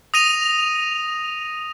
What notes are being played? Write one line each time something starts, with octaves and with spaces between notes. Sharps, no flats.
D#6 A#6 D#7 F7